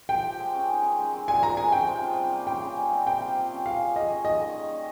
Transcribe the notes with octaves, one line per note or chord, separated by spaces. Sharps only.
F3 G5
G4
G#3
C#4
D#3
D#4
G#3
C4
A#2 G#5
A#2 A#5
G#3 G#5
C#4 G5
C3
F4
G3
A#3
C#3 G5
C#3
G3
C4
C3 G5
F4
G3
C#4
G3 F5
G#4
A#3 D#5
C#4
D#3 D#5
D#3
G3
C#4